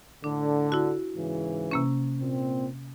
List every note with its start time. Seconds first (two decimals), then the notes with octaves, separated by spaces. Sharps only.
0.24 A2 D3 D4
0.72 E4 F#4
1.16 G#2 C#3 E3
1.71 C3 A#3 C#4
2.21 A#2 C4